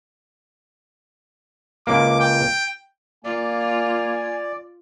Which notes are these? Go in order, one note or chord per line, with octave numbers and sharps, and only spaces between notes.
C#2 A#3 D6
G5
A#3 F4 D5 G#5